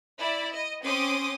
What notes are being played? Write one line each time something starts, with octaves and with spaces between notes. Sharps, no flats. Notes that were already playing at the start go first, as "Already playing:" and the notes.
E4 D5
D#5
C4 C#4 C6 D6 D#6